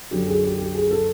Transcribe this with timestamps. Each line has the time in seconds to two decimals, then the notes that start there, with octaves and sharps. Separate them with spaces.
0.11 F#2 D3 G4
0.27 G#4
0.44 G4
0.59 G4
0.75 G#4
0.91 A4